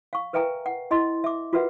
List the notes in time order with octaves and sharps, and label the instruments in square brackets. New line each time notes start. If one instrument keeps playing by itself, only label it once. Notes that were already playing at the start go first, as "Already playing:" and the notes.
[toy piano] F5 C#6
A#4 B4 E5 G5 G#5 A#5
F#5
E4 D#5 C6
E5 D6
F4 F#4 A#4 B4 E5 F#5